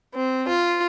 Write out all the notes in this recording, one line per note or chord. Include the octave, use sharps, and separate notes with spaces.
C4
F4